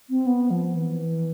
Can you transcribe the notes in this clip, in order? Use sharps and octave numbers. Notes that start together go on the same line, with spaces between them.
C4
B3
F3
E3